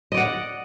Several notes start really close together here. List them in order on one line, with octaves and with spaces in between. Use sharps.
D#5 D5 F#5